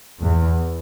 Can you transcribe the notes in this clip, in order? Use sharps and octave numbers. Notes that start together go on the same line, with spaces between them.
E2